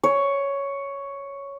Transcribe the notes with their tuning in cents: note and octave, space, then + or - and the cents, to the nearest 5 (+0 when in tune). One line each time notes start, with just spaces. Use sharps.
C#5 +5